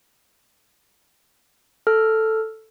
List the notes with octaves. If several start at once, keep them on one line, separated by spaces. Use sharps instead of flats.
A4 F6